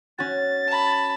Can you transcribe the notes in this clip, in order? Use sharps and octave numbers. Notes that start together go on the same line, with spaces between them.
C#4 F#4 A6
A5 B5